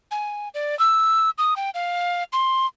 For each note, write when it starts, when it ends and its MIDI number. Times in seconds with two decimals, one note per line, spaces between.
0.11 0.49 80
0.54 0.77 74
0.79 1.30 88
1.38 1.54 87
1.56 1.70 79
1.74 2.23 77
2.33 2.66 84